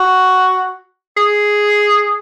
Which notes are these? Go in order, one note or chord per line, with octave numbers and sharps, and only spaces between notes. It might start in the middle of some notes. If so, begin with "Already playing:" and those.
Already playing: F#4
G#4